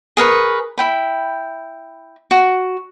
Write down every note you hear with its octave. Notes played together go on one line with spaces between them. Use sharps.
G#4 A#4 B4 C#6
E4 G5 B5
F#4